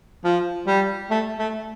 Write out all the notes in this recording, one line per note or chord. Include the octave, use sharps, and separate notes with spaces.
F3
G3
A3
A3